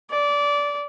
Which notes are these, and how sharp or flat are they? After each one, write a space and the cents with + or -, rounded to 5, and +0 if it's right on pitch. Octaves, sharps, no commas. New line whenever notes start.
D5 -20